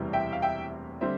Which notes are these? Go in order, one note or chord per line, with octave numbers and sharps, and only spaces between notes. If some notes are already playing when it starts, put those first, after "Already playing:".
Already playing: E1 D2 C3 E3 G3
E5 G5
F5
E5 G5
D3 G3 C4 C5 E5